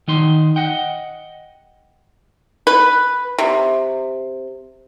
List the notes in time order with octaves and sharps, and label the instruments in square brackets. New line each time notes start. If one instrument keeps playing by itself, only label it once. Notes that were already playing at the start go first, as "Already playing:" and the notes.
[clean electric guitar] D#3 D#4 C6
D#5 F#5 G5
[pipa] B4
C3